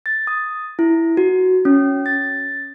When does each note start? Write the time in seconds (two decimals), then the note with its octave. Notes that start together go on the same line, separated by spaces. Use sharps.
0.06 A6
0.27 D#6
0.79 E4
1.17 F#4
1.65 C#4
2.06 A6